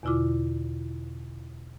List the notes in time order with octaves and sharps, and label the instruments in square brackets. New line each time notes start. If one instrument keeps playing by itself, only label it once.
[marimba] E2 B2 D3 E4 F4 D6